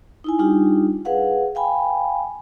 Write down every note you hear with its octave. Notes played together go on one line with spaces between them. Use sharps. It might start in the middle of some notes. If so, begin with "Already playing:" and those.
D#4 E4 G#5
G3 D4 D#4 F4 G4
G#4 B4 F5 F#5
F5 G5 G#5 B5